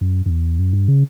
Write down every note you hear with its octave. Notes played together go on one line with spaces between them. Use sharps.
F#2
F#2
E2
F#2
G2
C#3